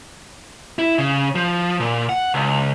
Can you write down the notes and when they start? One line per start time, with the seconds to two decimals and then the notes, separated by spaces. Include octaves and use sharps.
0.79 E4
0.98 C#3
1.35 F3
1.80 A#2
2.09 F#5
2.34 C#2